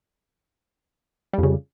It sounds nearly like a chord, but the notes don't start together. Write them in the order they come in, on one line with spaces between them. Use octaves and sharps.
G3 F2 C#3